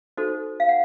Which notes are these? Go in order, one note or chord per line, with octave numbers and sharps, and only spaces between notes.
D#4 F#4 A4 C5
F5
F#5